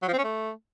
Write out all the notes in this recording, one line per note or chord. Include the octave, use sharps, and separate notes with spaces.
F#3
F3
C4
C#4
A3